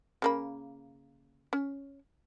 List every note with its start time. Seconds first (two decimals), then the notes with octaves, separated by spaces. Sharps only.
0.22 C#3 A#3 B5
1.53 C#4